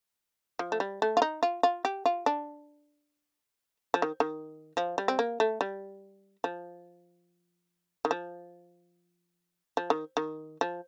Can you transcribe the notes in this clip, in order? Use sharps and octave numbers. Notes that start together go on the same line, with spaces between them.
F3
A3
G3
A3
F4
D#4
F4
F4
G4
F4
D4
F3
D#3
D#3
F3
G3
C4
A#3
A3
G3
F3
D#3
F3
F3
D#3
D#3
F3